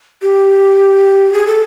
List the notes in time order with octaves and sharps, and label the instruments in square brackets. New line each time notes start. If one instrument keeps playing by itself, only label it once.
[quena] G4
G#4
A4